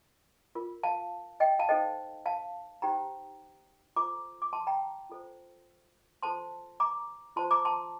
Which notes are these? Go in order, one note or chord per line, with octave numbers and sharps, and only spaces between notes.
F4 A#4
F5 A5
D#5 G5
F5 A5
D#4 A4 C5 D#5 G5
F5 A5
D#4 G4 C5 G5 A#5
F4 A4 C5 A#5 D6
D6
A5 C6
G5 A#5
F4 A4 C5
F4 A4 C5 A5 C6
A#5 D6
F4 C5 A5 C6
A#5 D6
A5 C6